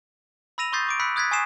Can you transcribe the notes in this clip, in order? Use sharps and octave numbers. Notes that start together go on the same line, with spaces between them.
B5 E6 A#6 D#7 F7
C6 C#6 D#6 G6 A6 C7
C#6 D6 D7
B5 E6 F#6 B6 C#7
D#6 F#6 G#6 A6 B6
G#5 C#6 D#6 C7 E7